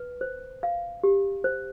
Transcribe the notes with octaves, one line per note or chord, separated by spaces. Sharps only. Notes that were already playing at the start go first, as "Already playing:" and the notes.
Already playing: B4
C5
F5
G4
C5